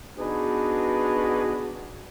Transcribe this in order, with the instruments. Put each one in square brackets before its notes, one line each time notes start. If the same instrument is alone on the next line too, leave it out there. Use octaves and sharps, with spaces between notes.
[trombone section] B3 D4 D#4 F#4 G#4 B4